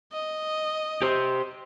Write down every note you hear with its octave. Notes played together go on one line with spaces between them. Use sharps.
D#5
G4 C5